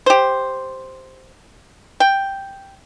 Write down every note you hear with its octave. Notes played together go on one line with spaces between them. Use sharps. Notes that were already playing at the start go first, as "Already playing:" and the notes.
G4 C5
G5